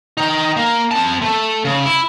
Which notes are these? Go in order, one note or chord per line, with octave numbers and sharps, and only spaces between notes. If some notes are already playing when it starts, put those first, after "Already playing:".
D#4 G5
A#3
C4 A5
A3
C#3
E4